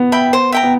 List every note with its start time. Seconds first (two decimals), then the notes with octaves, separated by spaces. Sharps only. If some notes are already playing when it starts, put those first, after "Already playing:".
Already playing: B3
0.12 E5 G5 B5
0.33 C5
0.52 E5 G5 A#5
0.63 B3